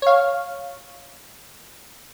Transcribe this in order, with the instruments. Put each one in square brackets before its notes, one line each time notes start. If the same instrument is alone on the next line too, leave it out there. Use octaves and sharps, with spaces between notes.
[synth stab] C#5 F5